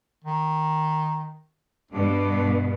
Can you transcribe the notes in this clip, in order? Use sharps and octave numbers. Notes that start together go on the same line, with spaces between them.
D#3
G2 B2 D4